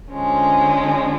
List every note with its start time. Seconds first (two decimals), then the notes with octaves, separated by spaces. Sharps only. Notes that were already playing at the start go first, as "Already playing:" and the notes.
0.11 D3 F3 G#3 C#4